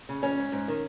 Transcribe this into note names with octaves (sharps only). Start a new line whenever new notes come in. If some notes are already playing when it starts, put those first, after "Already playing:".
C#3
F2 C#4
G#2
G#2
D#3